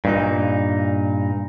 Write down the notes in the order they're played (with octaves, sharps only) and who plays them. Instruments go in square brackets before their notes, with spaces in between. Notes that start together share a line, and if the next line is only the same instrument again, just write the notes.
[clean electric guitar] G2 A#2 D#4